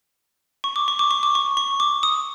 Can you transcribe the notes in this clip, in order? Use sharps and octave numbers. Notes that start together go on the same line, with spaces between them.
C#6
D6
C#6
D6
C#6
D6
C#6
C#6
D6
D#6